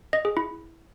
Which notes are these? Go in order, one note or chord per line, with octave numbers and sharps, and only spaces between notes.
D#5
G#4
E4